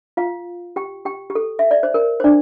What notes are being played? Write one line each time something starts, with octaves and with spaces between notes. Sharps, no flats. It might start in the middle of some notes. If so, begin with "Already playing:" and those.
F4 F5
G4 G5
G4 G5
G4
A4
E5
D5
C5
A#4
C5
D4 D5